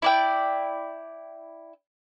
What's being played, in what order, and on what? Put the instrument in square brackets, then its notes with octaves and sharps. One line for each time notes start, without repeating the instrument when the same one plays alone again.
[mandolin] E4 D5 G5